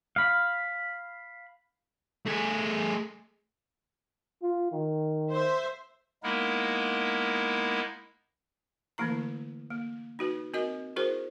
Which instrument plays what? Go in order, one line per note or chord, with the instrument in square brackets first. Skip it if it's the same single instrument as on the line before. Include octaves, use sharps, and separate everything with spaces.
[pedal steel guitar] F5 B5
[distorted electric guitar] A3 G#4
[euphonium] F4
D#3
[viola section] C5 E5
[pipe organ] G#3 A#3 B3 D#4 E4 A#4
[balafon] D3 E3 A3 A#3 E4 A#5
A#3
D#4 F#4 B4
C4 F#4 A#4 D#5
E4 F#4 G#4 A#4 C5